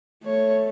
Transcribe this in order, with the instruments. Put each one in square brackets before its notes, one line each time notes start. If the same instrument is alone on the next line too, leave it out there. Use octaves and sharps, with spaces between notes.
[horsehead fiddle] A3 [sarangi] C#5